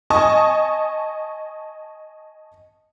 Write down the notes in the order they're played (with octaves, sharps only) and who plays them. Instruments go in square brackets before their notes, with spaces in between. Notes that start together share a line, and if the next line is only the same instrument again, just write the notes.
[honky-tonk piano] D#5 G#5 A5 C#6 D#6